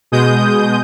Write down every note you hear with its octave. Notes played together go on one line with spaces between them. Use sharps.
B2 G#3 D#6 G6